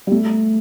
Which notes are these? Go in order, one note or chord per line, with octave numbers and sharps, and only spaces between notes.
G3
A3